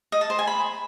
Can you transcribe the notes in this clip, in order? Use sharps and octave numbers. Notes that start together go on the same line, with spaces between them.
D#5
A5
C5
G#5
B5